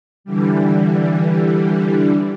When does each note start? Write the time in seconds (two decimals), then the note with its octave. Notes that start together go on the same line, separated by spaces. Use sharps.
0.24 D3 E3 G3